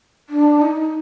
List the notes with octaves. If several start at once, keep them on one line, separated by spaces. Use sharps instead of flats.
D4
D#4